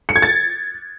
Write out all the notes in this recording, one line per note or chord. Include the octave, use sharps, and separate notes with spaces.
C#7
G#6
A6